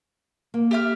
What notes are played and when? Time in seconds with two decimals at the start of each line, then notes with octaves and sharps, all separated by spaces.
0.54 A#3
0.71 G4 E5 F6